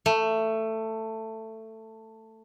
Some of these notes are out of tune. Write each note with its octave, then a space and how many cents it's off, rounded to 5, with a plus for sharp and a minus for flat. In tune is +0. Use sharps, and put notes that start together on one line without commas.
A3 +15